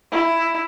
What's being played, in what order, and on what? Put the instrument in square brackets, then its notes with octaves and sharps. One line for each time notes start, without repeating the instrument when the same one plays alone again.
[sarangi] E4